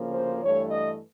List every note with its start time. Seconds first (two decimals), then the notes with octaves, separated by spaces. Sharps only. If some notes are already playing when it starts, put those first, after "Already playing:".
Already playing: D2 C#3 F3 A#3
0.14 C5
0.42 G2 E3 A3 C#5
0.71 D#5